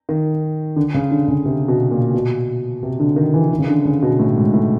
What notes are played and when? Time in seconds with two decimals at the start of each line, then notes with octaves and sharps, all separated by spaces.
0.09 D#3
0.76 D3
0.94 C#3
1.11 D3
1.28 C#3
1.45 C3
1.68 B2
1.91 A#2
2.14 B2
2.83 C3
3.00 D3
3.16 D#3
3.34 E3
3.51 D#3
3.59 C#3
3.67 D3
3.85 C#3
4.02 B2
4.19 A2
4.36 G#2
4.54 A2